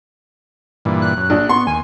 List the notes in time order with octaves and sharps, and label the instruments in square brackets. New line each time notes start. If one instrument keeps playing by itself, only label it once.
[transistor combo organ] G2 A#2 E3
[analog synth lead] F#6
[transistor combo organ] F#2
[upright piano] A#1 D4
[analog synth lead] B3 [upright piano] C6 [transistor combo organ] C#6
[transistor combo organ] D#2 [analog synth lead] G#5